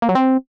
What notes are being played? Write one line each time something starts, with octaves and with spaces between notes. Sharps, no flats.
A#3
F#3
C4